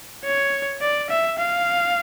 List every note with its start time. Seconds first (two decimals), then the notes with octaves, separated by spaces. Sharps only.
0.25 C#5
0.82 D5
1.10 E5
1.38 F5